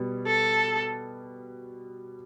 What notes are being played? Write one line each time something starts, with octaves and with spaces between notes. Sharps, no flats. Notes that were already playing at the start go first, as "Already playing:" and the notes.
Already playing: B2 G3 B3
A4